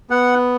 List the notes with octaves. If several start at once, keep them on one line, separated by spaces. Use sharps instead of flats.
B3 F#5